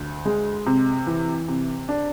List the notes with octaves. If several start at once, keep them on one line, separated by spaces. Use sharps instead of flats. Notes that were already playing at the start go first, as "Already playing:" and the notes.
Already playing: D2
G#3
C3
E3
C3
D4